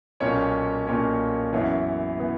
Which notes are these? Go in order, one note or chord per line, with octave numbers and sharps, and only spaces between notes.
B1 A#2 A#3 C#4 C#5
B1 A#2 A#3 C#4 C#5
F#2 E3 B3 C#5
E3 B3